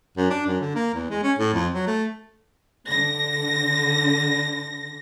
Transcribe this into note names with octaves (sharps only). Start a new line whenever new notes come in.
F#2
D4
F#2
D3
A#3
E2
G#3
C#4
A2
F2
F#3
A3
D3 A#6